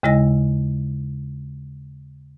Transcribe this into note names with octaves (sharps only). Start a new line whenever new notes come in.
D#2 C#3 G#3 E4 D#5 A#6